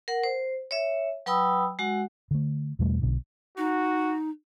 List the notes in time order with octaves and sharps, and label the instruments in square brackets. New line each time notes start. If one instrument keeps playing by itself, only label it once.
[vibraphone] A#4 F#5
C5
C#5 E5
F#3 B4 G5 B5 D#6 E6
G#3 F#4 F#5
[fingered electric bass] D3 A3
E2 B2 G3 A3
B1 B2 D3
[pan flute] D#4 [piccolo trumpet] F#4